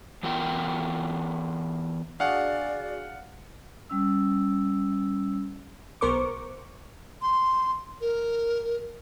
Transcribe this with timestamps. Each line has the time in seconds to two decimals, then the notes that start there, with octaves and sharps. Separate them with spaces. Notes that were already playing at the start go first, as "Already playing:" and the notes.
0.23 E3 B3 F4 A#4 G5
2.20 D4 F#4 G#4 D5 F5 F#5
3.90 G3 C#4 E6
6.01 B1 B3 A#4 C5 C#6 D6
7.22 C6
8.01 A#4